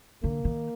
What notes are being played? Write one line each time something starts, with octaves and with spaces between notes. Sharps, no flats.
D3 A#3
D#3